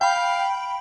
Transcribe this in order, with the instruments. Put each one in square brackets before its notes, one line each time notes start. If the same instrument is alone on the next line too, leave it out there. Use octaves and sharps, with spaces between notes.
[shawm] F5 [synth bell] G5 B5